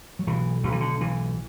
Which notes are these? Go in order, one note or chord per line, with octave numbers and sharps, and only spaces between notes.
F#3
B1 E3
B1 D3
E3
D3
B1 E3